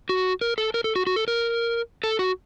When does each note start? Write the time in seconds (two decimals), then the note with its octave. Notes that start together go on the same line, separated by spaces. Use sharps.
0.09 F#4
0.41 A#4
0.58 A4
0.74 A#4
0.84 A4
0.96 F#4
1.07 F#4
1.16 A4
1.28 A#4
2.04 A4
2.19 F#4